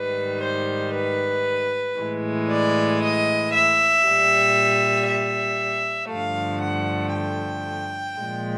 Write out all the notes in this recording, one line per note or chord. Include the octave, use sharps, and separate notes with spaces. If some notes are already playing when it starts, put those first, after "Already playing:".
Already playing: G#2 D#3 G3 B4
C5
B4
A2 E3 G#3
D5
D#5
E5
A#2 G3
E5
G2 D3 F3 A3 F5
F#5
G5
A#2 F3 G#3